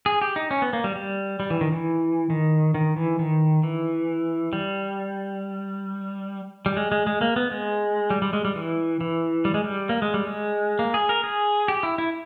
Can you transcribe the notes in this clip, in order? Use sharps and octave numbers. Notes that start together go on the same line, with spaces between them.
G#4
G4
D#4
C#4
B3
A#3
G3
G3
G3
E3
D#3
E3
D#3
D#3
E3
D#3
E3
G3
G3
G#3
G#3
G#3
A#3
B3
G#3
G3
G3
G#3
G3
E3
E3
G3
G#3
G3
A#3
G#3
G3
G#3
A#3
G#4
A#4
G#4
G4
E4
E4